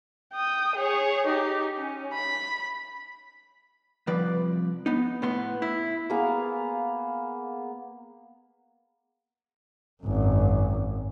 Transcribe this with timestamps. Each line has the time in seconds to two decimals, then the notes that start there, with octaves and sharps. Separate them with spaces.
0.34 G5 D#6
0.75 G#4 C#5
1.26 D#4 G4
1.77 C#4
2.13 B5
4.07 C2 F3 B4 D5
4.86 B3 D#4
5.22 A2 B3 C6
5.62 E4
6.10 A#3 B3 G#4 F5
10.03 G#1 F#2